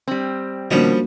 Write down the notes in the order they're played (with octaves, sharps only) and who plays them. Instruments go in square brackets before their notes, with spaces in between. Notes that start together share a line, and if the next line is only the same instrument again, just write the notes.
[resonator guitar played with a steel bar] G3 C4
[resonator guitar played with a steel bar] B2 D#3 [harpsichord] F3 G3 C#4 [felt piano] A#3 D4 F#4